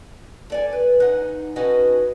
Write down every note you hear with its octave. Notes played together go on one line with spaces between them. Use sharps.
A4 D5 G#5
B4
D#4 F#5 G#5
C#4 D#4 F#4 A4 B4 D#5